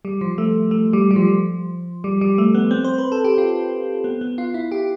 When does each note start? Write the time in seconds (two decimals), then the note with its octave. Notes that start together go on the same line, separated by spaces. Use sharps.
0.05 G3
0.21 F3
0.38 A3
0.71 A3
0.93 G3
1.11 G3
1.16 F3
2.04 G3
2.21 G3
2.38 A3
2.55 B3
2.71 C4
2.84 C5
2.98 B4
3.12 A4
3.24 G4
3.38 F4
4.04 B3
4.21 B3
4.38 F4
4.54 E4
4.72 G4